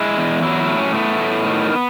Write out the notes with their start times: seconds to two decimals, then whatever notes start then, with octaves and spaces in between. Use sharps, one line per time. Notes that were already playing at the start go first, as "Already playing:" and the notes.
Already playing: G#3 E4
0.18 E2
0.43 F#3 E4
0.60 E4
0.69 A2
0.78 C#4
0.94 A3 B3
1.20 A2
1.46 D#3